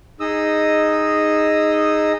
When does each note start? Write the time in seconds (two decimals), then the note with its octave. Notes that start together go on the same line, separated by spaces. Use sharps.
0.20 D#4 G#4 D#5 D#6 E6